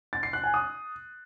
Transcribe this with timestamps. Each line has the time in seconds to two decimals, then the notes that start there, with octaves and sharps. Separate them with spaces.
0.13 A6
0.23 C7
0.33 F#6
0.44 G#5
0.54 D#6